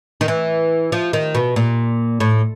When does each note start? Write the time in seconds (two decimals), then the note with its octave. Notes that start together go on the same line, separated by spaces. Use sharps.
0.21 D#3
0.28 E3
0.92 F3
1.13 D#3
1.35 B2
1.56 A#2
2.20 A2